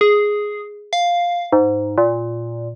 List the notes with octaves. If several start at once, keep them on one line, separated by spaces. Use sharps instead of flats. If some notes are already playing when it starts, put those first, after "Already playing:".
G#4
F5
G#2
A#2